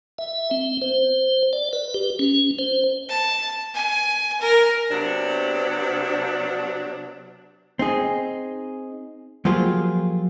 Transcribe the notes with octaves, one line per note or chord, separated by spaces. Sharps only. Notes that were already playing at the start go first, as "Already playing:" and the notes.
E5
C4
C5
D5
B4
G4
C#4
C5
A5
G#5
A#4
C3 F#3 B3 D4
C4 D#4 G#4
F3 F#3 A#3 F4 G4 G#4